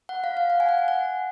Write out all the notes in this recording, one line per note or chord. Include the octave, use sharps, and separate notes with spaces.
F#5
F5
F5
F#5
G#5
F#5
G#5
F#5